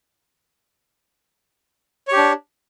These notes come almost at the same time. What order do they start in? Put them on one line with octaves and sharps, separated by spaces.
C#5 G4 D4